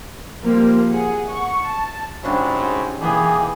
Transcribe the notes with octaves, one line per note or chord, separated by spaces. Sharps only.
F3 G3 A#3 C4
G#4 F#5
F#5 C#6
A5
G#2 C#3 F#3 G3 D4 E4 F#4
B2 E3 A#3 B3 D#4 G4 G#4